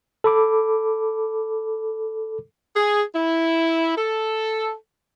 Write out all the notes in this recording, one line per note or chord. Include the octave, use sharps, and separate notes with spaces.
A4 B5 D6
G#4
E4
A4